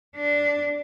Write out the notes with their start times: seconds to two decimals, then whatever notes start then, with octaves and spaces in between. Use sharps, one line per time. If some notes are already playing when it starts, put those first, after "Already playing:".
0.17 D4